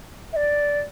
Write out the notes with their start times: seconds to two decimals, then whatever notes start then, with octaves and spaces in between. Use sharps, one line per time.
0.33 E5
0.36 D5